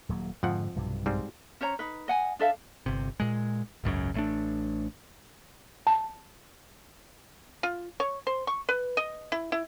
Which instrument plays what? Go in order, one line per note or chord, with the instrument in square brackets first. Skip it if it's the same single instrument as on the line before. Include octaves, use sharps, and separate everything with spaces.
[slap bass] D#1 F#3 A#3
[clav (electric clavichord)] F2 F3 F#5 [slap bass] G#2 D3
[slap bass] B1 G2 C3
[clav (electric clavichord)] G#2 G3 C4
[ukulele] C#4 C5 C#5 A#5
D#4 B4
D#5 F#5 G#5
D4 A4 E5 F5
[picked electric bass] G1 C3
A#2 G#3
G#1 C#2 F#2 C#3
A1 A3 D4
[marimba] A5
[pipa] F4
C#5
C5
C#6
B4
D#5
E4
E4